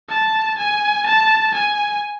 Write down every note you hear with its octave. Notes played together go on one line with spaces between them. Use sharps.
A5
G#5
A5
G#5